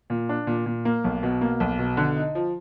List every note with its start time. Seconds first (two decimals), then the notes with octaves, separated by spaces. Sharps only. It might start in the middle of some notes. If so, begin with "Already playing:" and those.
0.10 A#2
0.29 D4
0.47 A#2
0.66 A#2
0.85 A#3
1.04 B1
1.23 B2
1.41 A#3
1.60 B1
1.79 B2
1.97 D3
2.16 D#4
2.35 F3